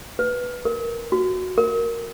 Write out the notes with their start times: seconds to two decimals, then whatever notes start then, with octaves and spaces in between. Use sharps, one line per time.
0.19 B4
0.65 A#4
1.12 F#4
1.58 A#4